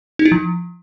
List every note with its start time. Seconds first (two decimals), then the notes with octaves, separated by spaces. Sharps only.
0.19 D#4
0.25 E4
0.32 F3